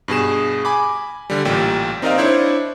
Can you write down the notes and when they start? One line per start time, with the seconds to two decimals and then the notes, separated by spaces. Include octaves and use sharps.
0.08 G2 B2 G#4 E7
0.65 G#5 B5 D6
1.30 D3 G3
1.45 A1 A#2 G3 G5
2.02 C4 D#4 A#4 D5 D#5 F5
2.18 D4 E4 C5 C#5